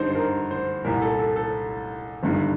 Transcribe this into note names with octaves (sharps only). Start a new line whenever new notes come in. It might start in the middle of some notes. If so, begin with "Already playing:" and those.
Already playing: G2 D3 D#4 C5
C5
A#4
C5
C2 A#2 A#4
A4
A4
A4
G1 G2 D#3